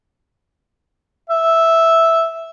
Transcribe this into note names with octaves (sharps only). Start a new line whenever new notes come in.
E5